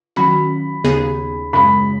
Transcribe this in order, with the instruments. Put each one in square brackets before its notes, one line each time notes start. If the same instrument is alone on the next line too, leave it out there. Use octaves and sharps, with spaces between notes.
[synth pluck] D#3 F#3 C#4 F#4 [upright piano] B5
[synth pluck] D#2 C#3 B3 D#4 G#4
[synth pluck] F#2 C#3 G#3 [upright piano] B5